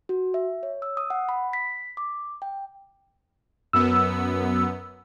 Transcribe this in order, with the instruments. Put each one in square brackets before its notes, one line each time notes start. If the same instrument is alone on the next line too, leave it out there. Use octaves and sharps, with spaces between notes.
[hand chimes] F#4
E5
C#5
E6
D#6
F#5
B5
B6
D6
G5
[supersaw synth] F#2 B3 [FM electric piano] E6